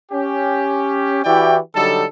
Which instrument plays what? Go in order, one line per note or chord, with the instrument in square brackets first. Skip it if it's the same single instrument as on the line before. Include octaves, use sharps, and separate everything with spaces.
[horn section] C#4 G4
E3 E4 F#4 G4 D5 G5
D3 F#3 G3 D#4 A4